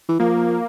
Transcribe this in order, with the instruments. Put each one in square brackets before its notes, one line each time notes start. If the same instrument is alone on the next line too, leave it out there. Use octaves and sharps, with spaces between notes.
[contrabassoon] E3
[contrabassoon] F3 [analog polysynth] A#3